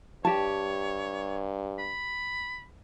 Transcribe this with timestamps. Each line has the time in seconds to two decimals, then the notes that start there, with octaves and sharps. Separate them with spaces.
0.25 G2 G4 C#5 A5
1.79 B5